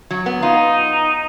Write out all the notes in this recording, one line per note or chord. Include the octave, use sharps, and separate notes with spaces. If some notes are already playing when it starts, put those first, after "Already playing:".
F#3
B3
D#4 F4